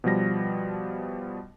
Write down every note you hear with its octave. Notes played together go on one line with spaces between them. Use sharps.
B2 F3 G3 A#6